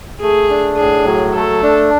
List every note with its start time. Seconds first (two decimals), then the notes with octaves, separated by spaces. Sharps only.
0.21 A3 G#4
0.50 D4
0.77 A2 G#4
1.06 F#3
1.35 A3 A4
1.63 D4